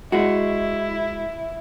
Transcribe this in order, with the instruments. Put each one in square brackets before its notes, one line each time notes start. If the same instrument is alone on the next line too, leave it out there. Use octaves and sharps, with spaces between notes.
[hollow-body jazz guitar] G#3 F#4 [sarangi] E4